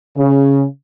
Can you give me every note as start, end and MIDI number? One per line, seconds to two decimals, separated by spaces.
0.17 0.63 49